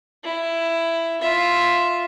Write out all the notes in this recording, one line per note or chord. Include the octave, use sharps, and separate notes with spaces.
E4
F4 E5